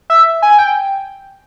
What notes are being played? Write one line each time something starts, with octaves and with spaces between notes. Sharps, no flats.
E5
G#5
G5